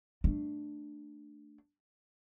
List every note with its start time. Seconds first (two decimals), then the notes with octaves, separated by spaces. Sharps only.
0.24 A3 D4